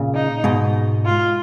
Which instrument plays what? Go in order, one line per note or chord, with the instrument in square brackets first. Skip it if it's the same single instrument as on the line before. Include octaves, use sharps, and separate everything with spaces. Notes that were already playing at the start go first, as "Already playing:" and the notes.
Already playing: [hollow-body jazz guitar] A#2 C#3
[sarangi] D#4
[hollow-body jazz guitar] G#2 B2
[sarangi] F4